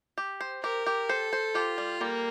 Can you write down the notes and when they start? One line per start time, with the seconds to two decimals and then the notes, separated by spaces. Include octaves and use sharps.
0.18 G4
0.41 C5
0.63 G4 A#4
0.86 G4
1.09 A4 C5
1.33 C5
1.55 F4 G4
1.78 G3
2.01 G3 A#3